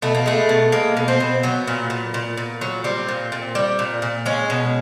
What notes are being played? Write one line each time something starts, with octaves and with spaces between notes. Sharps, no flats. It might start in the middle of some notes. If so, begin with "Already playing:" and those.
B2 A3
A#3
G#3 A3
B2
G#3 A#3
B2
C4
B2
F#3 B3
A#2
A#2
A#2
A#2
F#3
G3 C4
A#2
A#2
G3
A#2
A#2
G#3 C#4
B2